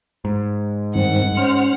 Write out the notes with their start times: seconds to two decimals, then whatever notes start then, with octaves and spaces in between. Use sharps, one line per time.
0.25 G#2
0.95 G2 D#3 C4 F#5
1.37 C#4 C5 F6